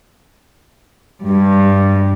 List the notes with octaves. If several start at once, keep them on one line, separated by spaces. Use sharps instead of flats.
G2